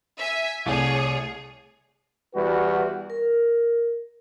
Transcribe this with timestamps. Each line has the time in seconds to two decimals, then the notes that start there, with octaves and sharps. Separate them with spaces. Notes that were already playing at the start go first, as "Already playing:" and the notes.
0.18 E5 G#5
0.66 C2 A3 G#4 C#5
2.35 E2 G3 F#4 B4
3.10 A#4